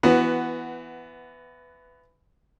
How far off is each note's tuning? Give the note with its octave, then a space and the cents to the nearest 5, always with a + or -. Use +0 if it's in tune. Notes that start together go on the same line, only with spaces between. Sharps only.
E3 +15 B3 +0 F#4 +10